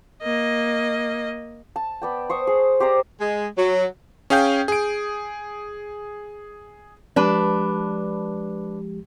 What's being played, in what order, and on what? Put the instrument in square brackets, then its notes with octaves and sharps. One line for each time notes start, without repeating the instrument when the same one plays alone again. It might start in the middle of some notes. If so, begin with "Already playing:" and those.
[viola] A#3 D#5
[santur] A5
B3 D5 G5
C5 C#6 D#6
G#4
G4 C5 D5 A#5
[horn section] G#3
F#3
[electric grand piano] C#4 G#4 F5 G5 G6
G#4 D7
[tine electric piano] F3 G#3 G4 [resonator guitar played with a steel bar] D4 B4